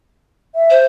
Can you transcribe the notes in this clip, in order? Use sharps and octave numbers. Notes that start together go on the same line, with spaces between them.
E5
C5